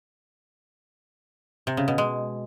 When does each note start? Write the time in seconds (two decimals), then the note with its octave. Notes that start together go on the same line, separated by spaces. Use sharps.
1.67 C3
1.77 C#3
1.88 B2
1.98 G#3